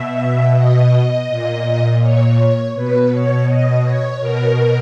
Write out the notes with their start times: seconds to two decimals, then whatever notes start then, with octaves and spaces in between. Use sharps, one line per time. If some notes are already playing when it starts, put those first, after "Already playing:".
Already playing: B2 E5
0.55 D#5
1.28 A#2
2.02 C#5
2.75 B2 B4
3.11 C#5
3.47 D#5
3.84 C#5
4.21 B2 A#4